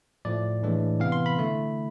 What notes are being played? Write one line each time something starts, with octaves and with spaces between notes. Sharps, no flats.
A2 F3 A3 D5
A2 E3 G#3 D4
C3 E3 B3 F5
C6
B5
D3 A3 E4